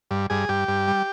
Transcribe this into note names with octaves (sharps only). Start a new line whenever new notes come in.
G2
G2 G#4
G2 G4
G2
G3